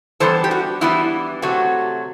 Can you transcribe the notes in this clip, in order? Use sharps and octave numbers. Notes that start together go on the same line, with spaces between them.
E3 G3 B3 D4 A4 C5
G4
F#4
E3 G3 B3 D4 E4
C3 F#3 A3 F#4